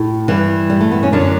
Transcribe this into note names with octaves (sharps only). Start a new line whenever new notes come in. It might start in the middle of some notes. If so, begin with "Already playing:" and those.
Already playing: A2
G2 E3
G3
A3
B3
C#4
F#2 D3 D4